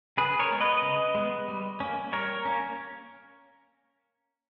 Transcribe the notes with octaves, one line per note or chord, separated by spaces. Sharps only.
C#3 G#4 B4
A#4 C#5
G#3 B3
B4 D#5
C#3
G#3 B3
G3
A#3 C#4
G3 A#4 C#5
A#3 C#4